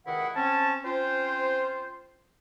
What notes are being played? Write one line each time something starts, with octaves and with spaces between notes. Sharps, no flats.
C#2 C3 D#3 E4 D#5 F#5
C4 C#4 A5
C4 C#4 F4 C5